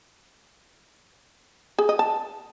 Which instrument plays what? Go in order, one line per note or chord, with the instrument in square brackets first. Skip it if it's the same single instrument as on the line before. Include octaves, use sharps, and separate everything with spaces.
[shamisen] G#4
D#5
A5